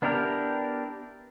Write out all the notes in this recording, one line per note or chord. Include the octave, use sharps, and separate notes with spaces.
B3 D4 E4 G4 A#4